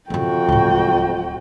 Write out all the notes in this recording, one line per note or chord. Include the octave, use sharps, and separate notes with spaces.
F2 C#3 B3 F#4 G5
D1 C#2 A2